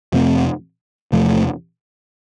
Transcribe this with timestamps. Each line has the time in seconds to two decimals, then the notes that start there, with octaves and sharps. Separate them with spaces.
0.12 F2 C3 A3 C4
1.12 E2 C3 F3 A3